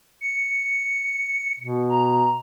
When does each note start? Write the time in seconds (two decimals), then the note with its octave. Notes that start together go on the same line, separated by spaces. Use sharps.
0.21 C#7
1.60 B2
1.89 A#5